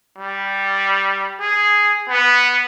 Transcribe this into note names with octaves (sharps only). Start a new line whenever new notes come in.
G3
G#4
B3